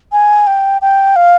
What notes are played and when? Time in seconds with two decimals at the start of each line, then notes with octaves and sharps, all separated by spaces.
0.12 G#5
0.47 G5
0.82 G5
1.16 F5